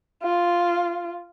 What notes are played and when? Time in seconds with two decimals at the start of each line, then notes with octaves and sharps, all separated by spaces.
0.23 F4